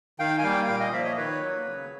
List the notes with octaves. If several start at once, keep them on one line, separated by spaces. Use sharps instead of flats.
D#3 F5 G5
G#5
G3 A#3 F5 G5
A#2 F5 G5
D#5 F5
F3 A#3 D5 E5
C#5 D#5
D#3 B4 C#5
F#3 A#3
C#3